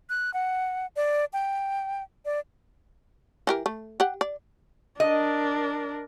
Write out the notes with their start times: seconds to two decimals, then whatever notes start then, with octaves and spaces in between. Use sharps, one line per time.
0.10 F#6
0.34 F#5
0.96 D5
1.33 G5
2.25 D5
3.47 E3 G4 A#4
3.66 A3
4.00 G4 F#5
4.21 D5
5.00 D4 A#4 D#5